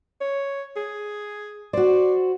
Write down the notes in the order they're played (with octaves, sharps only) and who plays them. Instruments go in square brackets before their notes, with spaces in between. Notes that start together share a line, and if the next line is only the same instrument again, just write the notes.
[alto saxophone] C#5
G#4
[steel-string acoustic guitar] F#4 C5 [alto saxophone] D5